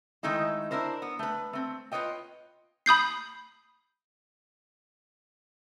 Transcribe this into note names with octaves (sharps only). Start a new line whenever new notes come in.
D#3 G#3 A3 D#4 E4
D4 E4 A#4 C5
B3
A3 B4
A3 C4
F4 B4 C#5 D#5 G5
B5 D#6 G6 C7